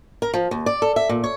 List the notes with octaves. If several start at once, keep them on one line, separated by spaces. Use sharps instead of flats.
A#4
F3
D#2
D5
A4
E5
A#2
C#5